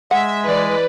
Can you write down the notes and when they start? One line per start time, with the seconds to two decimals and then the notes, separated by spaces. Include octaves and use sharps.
0.11 G#3 E5 F#5
0.45 E3 B4 D5